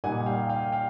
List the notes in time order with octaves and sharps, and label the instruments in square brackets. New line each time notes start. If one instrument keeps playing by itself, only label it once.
[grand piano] A#2 G3 A#3 D#4 F#5 G#5
F5 G5
F5 G5
F5 G5